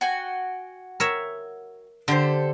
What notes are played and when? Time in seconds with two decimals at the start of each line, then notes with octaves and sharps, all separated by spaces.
0.01 F#4 G5 G#5
1.00 A#4 C#5 E5
2.08 D3 G4 A4 C5